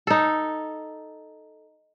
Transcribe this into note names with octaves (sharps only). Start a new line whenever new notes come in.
D#4 A4